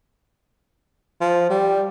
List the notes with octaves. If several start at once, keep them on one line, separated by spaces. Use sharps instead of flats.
F3
G3